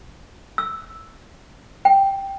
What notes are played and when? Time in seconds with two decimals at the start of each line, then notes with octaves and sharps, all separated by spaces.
0.58 E6
1.85 G5